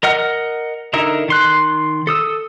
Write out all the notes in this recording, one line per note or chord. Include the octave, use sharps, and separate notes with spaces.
A#4 D#5 F#5 F6
D3 D#4 E4 A#4
D#3 C6 F#6
A4 D#6 E6